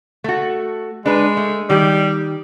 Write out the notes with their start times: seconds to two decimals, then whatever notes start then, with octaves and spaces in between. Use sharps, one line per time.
0.24 A3 F#4
1.06 G#3 D4 B4
1.37 A3
1.70 D#3 G3 G4